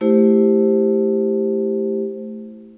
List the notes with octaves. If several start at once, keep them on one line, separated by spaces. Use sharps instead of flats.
A3 E4 G4 C5